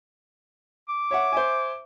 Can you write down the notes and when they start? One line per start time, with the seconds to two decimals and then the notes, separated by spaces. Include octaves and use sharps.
0.89 D6
1.11 C#5 E5 F#5
1.33 C5 E5 G#5